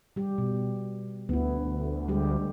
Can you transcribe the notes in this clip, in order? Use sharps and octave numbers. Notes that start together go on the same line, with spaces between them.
G3 G4
B2
D2 B3 E4
G3 G#3 G4